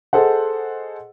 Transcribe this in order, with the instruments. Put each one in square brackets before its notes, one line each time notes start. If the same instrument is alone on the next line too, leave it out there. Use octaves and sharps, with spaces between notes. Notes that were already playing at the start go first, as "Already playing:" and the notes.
[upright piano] G#4 A4 C5 D#5 F#5